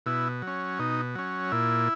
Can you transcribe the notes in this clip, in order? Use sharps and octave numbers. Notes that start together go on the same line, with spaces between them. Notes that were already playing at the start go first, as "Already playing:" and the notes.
B2 E4
F#3
C#4
B2 D#4
F#3 C#4
A#2 E4